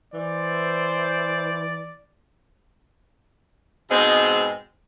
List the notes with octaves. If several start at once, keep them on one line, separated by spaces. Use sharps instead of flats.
E3 C5 D5
G#2 B2 G#3 C4